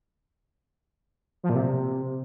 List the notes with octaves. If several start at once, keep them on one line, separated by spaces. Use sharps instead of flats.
F3
A#2
C3